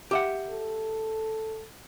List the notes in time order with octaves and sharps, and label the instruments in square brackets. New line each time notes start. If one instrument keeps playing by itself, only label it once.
[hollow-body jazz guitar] G4 E5 F#5
[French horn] A4